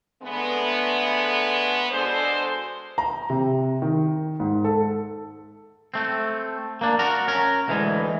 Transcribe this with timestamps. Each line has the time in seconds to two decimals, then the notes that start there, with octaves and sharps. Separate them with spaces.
0.22 D3 G#3 A3 B3
1.91 B2 G#3 D4 A4 C5
2.98 A#5
3.30 C3
3.82 D#3
4.40 G#2
4.64 A4
5.94 A3 C4
6.81 A#3 D4
6.99 F#4 A#4
7.28 C#4 A#4
7.68 D2 E3 G#3